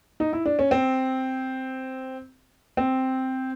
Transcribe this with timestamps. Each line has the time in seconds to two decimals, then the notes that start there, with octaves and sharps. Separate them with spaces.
0.20 D#4
0.33 E4
0.46 D4
0.59 C#4
0.71 C4
2.77 C4